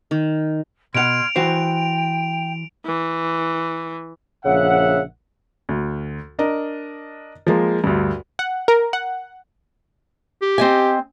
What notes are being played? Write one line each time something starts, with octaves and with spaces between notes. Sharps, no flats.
D#3
B2 F#5 C6 F6 G#6 D7 F7
E3 F#4 C5 G5
E3
A#1 C#3 E5 F#5
D2
D4 A#4 D#5
F3 G#3 A#3
D2 G2
F#5
A#4
F#5
G4
C4 D#5 G#5